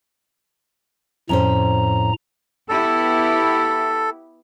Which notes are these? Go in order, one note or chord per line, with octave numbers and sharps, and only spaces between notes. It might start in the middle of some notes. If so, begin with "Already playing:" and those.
F2 A2 C#4 C5 A#5
B3 E4 G4 A4